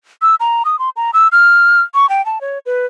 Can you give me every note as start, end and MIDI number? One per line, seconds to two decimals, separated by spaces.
0.22 0.35 88
0.40 0.63 82
0.65 0.79 87
0.79 0.90 84
0.96 1.11 82
1.14 1.28 88
1.32 1.81 89
1.94 2.09 85
2.09 2.24 79
2.26 2.41 81
2.41 2.59 73
2.66 2.86 71